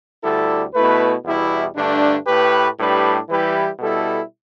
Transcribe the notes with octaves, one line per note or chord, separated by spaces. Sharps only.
D2 D3 G3 E4 A4
B2 A3 E4 B4
E2 B2 G3 E4
G2 D3 A3 D4
A2 A3 G4 B4
A2 G3 D4 G4 B4
E3 G3 E4 G4 B4
B2 G3 E4 A4